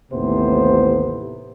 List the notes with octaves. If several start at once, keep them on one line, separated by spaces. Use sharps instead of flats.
A1 D#2 A2 C3 B3 C5